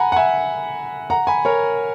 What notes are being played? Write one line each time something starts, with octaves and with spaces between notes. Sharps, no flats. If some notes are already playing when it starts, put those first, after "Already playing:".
Already playing: F#5 G#5 A#5 B5
F#5
E5 G#5
F#5 A#5
G#5 B5
A#4 C#5